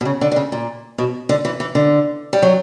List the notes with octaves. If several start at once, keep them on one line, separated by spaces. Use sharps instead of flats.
B2
C#3
D3
D3
C#3
A#2
B2
D3
E3
E3
D3
G3
F#3